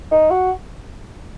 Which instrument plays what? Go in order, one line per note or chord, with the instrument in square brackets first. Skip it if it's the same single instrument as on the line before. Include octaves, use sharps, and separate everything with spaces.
[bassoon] D#4
F#4